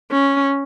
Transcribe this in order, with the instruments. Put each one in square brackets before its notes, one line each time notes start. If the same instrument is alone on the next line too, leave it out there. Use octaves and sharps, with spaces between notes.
[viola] C#4